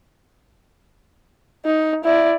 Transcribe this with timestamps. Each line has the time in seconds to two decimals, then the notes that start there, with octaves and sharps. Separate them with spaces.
1.65 D#4
2.04 E4 D5